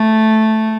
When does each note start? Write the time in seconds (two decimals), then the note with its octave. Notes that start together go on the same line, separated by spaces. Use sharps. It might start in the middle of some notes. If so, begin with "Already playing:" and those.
Already playing: A3